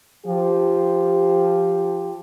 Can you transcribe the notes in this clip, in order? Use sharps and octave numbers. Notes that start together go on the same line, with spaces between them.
F3 G4